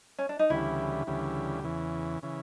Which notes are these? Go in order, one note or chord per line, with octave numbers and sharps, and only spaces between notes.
C#4
D4
D#4
D2 C#3 E3 G3 E4
D2 C#3 E3 G3
E2 C#3 E3
C#3 E3